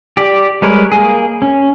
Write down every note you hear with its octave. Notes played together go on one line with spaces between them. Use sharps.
G4 D5
G3 G#3 A#4 B4 C#5
A#3 G#4
C#4